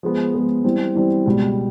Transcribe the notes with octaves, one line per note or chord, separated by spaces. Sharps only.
F3 G#3 B3
F3 G#3 B3
E3 G3 C4
E3 G3 C4
C#2 B2 G3